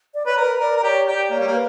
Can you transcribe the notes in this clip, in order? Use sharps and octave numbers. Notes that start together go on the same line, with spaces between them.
D5
B4 C#5
A#4 B4
A#4 D5
A#4
G4 C#5
G4 D5
A#3 C#5
G3
A#3
B4